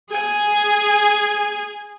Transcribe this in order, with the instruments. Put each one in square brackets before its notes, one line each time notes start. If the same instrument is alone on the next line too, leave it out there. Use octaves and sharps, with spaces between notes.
[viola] G#4 G#5